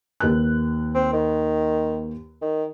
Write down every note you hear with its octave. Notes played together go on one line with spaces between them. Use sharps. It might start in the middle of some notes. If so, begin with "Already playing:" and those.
D#2 B4 F#6
C4
D#3
D#3